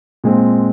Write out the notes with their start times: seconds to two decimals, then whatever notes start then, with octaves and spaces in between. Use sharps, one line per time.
0.24 A#2 G#3 C4